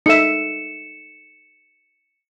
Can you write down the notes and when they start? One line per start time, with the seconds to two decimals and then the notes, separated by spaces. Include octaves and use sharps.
0.06 D#4 A4 E5 C#7 E7